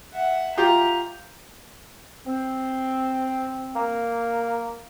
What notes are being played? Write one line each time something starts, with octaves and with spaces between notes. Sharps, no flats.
E5 F#5
F4 G4 A#5
C4
A#3